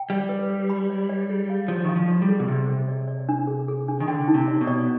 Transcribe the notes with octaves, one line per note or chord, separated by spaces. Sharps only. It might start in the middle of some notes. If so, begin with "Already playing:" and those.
Already playing: G5
G3 D5
B4
B4
B5
D5
D5
G#4
F5
F3 D5
D#3 F5
F3
D5
G3
G#4
B2
C3 G#4
G#4
D5
D5
D4
G#4
G#4
D4
D#3
D3 G5
D#4
C3
D5
B2
D5